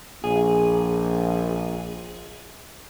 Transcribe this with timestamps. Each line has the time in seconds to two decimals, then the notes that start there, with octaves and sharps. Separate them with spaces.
0.24 A#1 G#4